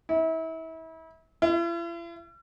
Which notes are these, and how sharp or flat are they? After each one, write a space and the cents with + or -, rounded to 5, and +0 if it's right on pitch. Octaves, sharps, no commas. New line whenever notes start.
E4 -35
E4 +45